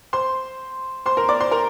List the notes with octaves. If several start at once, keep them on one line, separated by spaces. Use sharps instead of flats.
C5 C6
C5 C6
A#4 A#5
D5 D6
C5 C6
A#4 A#5